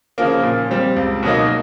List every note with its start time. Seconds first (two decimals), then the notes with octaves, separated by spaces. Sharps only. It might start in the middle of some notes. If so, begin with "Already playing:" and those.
0.18 C#3 F3 A#3
0.43 A#2
0.71 G3 C4
0.96 C#2
1.23 B2 F#3 A#3 D#4